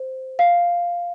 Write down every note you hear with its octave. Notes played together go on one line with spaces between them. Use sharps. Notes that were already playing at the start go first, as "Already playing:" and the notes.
Already playing: C5
F5